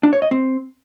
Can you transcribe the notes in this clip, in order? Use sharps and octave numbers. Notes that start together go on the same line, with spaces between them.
D4
C#5
D#5
C4